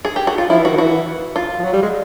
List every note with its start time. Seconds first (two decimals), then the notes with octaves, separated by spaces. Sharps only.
0.05 G#4
0.16 G4
0.27 F#4
0.38 F4
0.50 F3 E4
0.59 E3
0.65 D#3 F#4
0.77 E3 F#4
1.36 F4
1.59 F3
1.64 F#3
1.73 G3
1.83 G#3